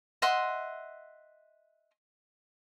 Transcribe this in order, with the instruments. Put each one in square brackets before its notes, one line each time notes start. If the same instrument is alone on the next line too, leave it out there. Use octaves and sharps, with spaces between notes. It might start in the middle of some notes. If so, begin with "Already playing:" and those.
[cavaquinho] D#5 E5 F#5 C6